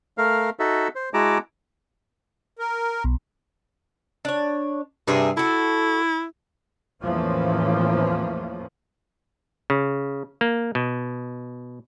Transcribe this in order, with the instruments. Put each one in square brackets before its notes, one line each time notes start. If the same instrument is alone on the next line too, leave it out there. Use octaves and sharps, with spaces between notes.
[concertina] A3 A#4 F5
D#4 F#4 A4 E5
C5
G#3 E4 F#4 A5 A#5 D6
[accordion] A#4
[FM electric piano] B1
[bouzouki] D4 C#5
[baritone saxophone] G2 [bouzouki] C3 G#4 E5
[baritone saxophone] E4 [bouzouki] F#4 A4
[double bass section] E2 A2 E3 F3 A#3 C#4
[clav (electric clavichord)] C#3
A#3
B2